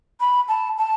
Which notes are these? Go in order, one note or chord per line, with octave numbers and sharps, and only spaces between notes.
B5
A5
A5